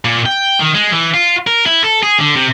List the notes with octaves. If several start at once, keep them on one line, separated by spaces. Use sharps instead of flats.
A#2
G5
D#3
G#3
E3
F4
A#4
E4
A4
G#4
D3
C3